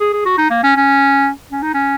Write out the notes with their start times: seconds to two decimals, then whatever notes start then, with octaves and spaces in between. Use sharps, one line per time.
0.01 G#4
0.13 G#4
0.26 F#4
0.38 D#4
0.50 A#3
0.64 C#4
0.76 C#4
1.51 C#4
1.63 D#4
1.74 C#4